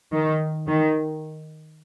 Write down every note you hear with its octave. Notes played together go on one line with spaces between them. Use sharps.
D#3
D#3